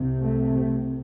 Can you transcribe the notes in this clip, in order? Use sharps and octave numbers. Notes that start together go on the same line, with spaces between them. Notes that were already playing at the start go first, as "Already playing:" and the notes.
Already playing: C2 C3
A3